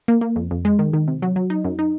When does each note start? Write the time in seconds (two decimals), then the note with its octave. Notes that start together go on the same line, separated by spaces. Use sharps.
0.08 A#3
0.21 A#3
0.36 F2
0.51 F2
0.65 G#3
0.79 D#3
0.93 D#3
1.08 C3
1.22 F#3
1.36 F#3
1.50 D#4
1.65 F#2
1.79 D#4